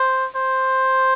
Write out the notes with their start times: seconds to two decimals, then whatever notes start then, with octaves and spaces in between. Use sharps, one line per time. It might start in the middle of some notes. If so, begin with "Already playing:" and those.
Already playing: C5
0.36 C5